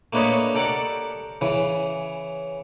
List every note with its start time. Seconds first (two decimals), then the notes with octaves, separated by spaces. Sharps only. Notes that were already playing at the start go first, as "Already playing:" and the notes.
0.13 A3 A#3 D4 B4 C#5 D#5
0.55 G4 A4 A#4 D5 F#5
1.41 C#3 E3